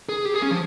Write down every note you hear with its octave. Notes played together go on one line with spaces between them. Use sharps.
G#4
G4
G#4
C#4
F3